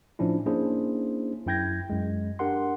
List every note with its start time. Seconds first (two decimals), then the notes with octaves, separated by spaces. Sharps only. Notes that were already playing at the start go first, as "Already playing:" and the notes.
0.19 A2 F3 C#4 D4 E4
0.46 A#3 C#4 D4 E4 G#4 C5
1.46 F#2 E4 G5 G6 G#6 A#6
1.90 F#2 G#3
2.39 D4 G4 A#4 F#5 C6